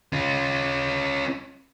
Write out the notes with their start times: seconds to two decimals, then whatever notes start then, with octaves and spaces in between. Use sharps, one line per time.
0.13 C#4 F4